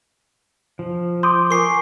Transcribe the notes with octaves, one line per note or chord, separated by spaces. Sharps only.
F3
C6 D6 D#6 G6
A#4 G#5 C#6 D6 C7